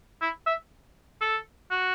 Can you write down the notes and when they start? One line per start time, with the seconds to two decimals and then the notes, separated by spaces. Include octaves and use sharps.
0.21 E4
0.46 E5
1.21 A4
1.71 F#4